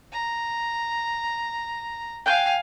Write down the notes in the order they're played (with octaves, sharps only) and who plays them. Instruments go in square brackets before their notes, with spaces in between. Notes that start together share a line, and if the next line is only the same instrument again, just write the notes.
[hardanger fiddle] A#5
[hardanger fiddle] F5 G#5 [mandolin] G5 F#6 G6